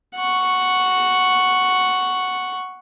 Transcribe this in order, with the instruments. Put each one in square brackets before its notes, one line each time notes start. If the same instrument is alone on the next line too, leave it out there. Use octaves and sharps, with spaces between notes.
[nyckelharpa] F#5 C#6